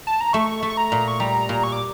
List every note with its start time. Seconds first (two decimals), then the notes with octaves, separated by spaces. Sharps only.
0.07 A5
0.21 A#5
0.33 A3 C#6
0.63 A3
0.70 C#6
0.77 A#5
0.92 A#2
1.08 C#6
1.20 G3 A#5
1.49 A#2
1.63 C#6
1.72 D6